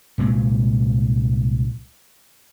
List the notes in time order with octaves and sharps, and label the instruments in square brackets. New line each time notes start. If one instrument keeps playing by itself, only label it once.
[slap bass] C2 A#2 F#3 G#3